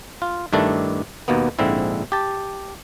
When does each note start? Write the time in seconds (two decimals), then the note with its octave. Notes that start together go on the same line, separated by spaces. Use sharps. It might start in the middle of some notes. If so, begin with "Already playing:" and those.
0.22 F4
0.53 G2 D#3 A3 D4 E4 D5
1.28 D#2 B2 A#3 B3
1.59 A#1 G#2 D3 C4 E4
2.12 G4 A5